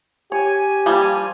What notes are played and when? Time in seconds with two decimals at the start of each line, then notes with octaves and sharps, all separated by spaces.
0.32 G4 C#5 G#5
0.86 F3 G3 A#3